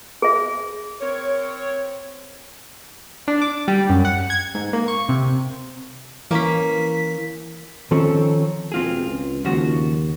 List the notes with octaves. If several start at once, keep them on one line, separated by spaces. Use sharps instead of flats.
G#4 E5
C4 A#4 C#5
D4
D6
G3
F#2
F#5
G#6
G#2
A#3
C#6
C3
E3 A#3 C#4 B6
D#3 F3 C4 C#4 A4 C#5
E1 C4 F4 G#4
C#2
D#2 C#3 F3 F#4